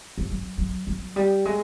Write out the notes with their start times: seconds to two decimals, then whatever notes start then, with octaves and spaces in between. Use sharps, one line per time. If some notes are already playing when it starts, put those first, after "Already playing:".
0.18 F3
0.30 F#3
0.58 F#3
0.87 F#3
1.16 G3
1.45 G#3